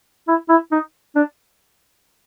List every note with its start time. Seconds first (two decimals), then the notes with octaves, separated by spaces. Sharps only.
0.28 E4
0.49 E4
0.72 D#4
1.16 D4